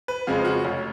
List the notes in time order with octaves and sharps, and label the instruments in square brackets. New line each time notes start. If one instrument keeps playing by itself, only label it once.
[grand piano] B4
F2 C#3 F3 G#3 F4
F#4
F1 C#4